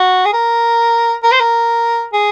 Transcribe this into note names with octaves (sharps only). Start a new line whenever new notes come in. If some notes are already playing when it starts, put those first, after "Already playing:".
Already playing: F#4
G#4
A#4
A#4
C5
A#4
G#4